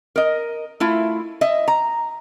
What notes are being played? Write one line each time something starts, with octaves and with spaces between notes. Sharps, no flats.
A#4 D#5
A3 E4 F4
D#5 E5
A#5